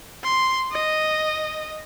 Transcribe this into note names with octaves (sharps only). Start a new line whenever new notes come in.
C6
D#5